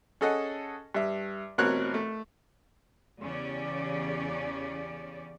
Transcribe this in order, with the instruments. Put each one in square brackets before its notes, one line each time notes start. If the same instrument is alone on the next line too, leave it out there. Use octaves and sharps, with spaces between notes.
[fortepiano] C#4 G#4 A4 D#5 F#5
G2 E5
A1 B2 C4 A#4 C#5 F#6
A3
[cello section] E2 C#3 C#4 G4 D5